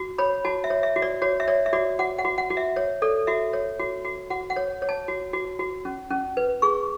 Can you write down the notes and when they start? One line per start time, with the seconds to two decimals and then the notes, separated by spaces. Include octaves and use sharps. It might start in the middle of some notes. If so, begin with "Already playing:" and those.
Already playing: F#4
0.18 C#5 B5
0.45 F#4 A5
0.64 E5
0.70 C#5
0.83 E5
0.96 F#4
1.02 D5
1.22 F#4 C#5
1.40 E5
1.48 C#5 D5
1.66 E5
1.73 F#4 D5
1.99 F#4 F#5
2.19 F#5
2.25 F#4
2.38 F#5
2.50 F#4
2.57 E5
2.76 C#5
3.02 A4 D5
3.27 F#4 E5
3.53 C#5
3.79 F#4
4.05 F#4
4.30 F#4 F#5
4.50 F#5
4.56 C#5
4.82 C#5
4.89 A5
5.08 F#4
5.33 F#4
5.59 F#4
5.85 C#4
6.11 C#4
6.37 B4
6.62 G#4 C#6